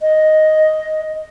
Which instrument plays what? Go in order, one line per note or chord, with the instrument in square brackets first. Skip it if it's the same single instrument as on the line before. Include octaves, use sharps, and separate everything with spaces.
[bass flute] D#5